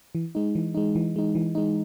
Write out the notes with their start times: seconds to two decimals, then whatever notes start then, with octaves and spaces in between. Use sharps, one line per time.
0.15 E3
0.35 G#3 D#4
0.55 E3
0.74 G#3 D#4
0.95 E3
1.16 G#3 D#4
1.35 E3
1.55 G#3 D#4